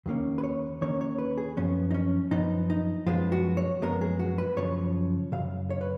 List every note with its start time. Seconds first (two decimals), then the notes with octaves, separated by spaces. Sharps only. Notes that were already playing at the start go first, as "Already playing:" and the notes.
0.06 D#2 D#3 A#3 C#4
0.38 B4
0.43 C#5
0.81 D#2 D#3 A#3 C#4 C#5
1.01 C#5
1.18 B4
1.38 G#4
1.57 F#2 F3 B3 C#4
1.91 D#4
1.94 C#4
2.31 F#2 F3 B3 D#4
2.70 D#4
3.06 F#2 F3 G#3 B3 F4
3.32 F#4
3.57 C#5
3.82 F#2 F3 G#3 B3 A#4
4.01 G#4
4.19 F#4
4.38 B4
4.57 F#2 C#3 F3 C#5
5.32 F#2 C#3 F5
5.70 C#5
5.81 B4